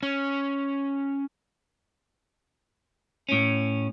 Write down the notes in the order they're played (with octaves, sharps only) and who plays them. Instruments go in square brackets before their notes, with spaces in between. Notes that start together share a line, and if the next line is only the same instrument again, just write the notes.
[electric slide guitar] C#4
[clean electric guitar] A2 C#4